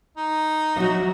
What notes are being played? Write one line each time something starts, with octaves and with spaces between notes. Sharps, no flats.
D#4
F#3 F#4 D#5 E5